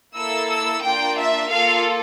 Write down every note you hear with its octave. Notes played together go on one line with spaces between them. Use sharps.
A#3 E4 A4 E6
E6
A#3 D4 F4 G5
E5
A#3 F4 A4 F5